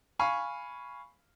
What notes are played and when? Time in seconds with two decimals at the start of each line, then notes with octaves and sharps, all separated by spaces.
0.19 F5 G#5 B5 C#6